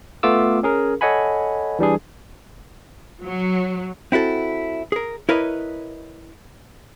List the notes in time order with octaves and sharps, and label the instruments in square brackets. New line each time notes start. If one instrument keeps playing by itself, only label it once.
[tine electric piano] A3 B3 F4 D6 E6
C#4 G#4 A#4
A4 C#5 D#5 F#5 G#5 B5
E3 G3 D4 G#4
[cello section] F#3
[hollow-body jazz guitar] C4 E4 F#4 A4
G#4 A#4
E4 A#4 B4 C#5 D#5